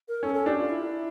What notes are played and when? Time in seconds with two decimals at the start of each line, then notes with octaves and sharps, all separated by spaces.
0.08 A#4
0.23 C#4 A4
0.35 A4
0.46 D4 G4
0.58 F4
0.70 E4